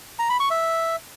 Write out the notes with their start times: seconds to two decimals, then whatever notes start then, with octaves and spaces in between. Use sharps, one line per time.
0.19 A#5
0.29 B5
0.40 C#6
0.50 E5